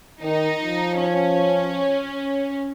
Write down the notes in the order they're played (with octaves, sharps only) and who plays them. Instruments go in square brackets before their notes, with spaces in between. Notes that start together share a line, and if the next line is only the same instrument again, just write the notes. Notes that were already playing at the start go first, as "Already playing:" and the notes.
[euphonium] D#3 [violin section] D#4
[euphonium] F3
[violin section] C#4